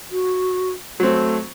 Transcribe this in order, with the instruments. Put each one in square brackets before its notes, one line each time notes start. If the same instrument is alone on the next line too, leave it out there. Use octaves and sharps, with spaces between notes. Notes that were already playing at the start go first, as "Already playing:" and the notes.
[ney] F#4
[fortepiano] F#3 C4 [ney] A3